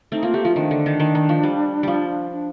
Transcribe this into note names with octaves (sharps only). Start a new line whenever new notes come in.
A3 C4 D#4
A#3 F4
A3 G4
F3 F4
D#3 D4
D3
D#3
D#3
D#3
F3
G3
F3 G3
D4